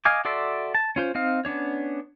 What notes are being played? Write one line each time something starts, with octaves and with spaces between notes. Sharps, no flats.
D#5 F5 G#5 D6
F#4 A4 D5 E5 C6
A5
C#4 F4 C5
C4 D#4 F5
B3 C#4 D4 C#5